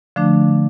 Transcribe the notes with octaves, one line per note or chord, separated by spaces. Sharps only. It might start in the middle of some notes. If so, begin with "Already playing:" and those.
D3 F3 A3 D4